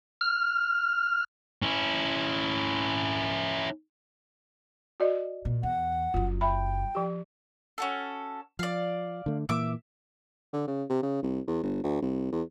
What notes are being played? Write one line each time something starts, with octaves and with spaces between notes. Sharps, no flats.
F6
C#4 E4
F#4 D5 D#5
A#2
E2 F#5
F#1 F#2 F4
E5 G5 B5
F3 G4
C#4 F#4 A4
F3 D5 F5
D3 A3
A#2 E3 A#3 E5 D6
D3
C#3
C3
C#3
C2
E2
G1
D2
C2
E2